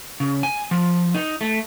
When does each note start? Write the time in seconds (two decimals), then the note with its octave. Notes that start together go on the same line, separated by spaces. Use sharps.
0.20 C#3
0.43 G#5
0.71 F3
1.15 D#4
1.41 A3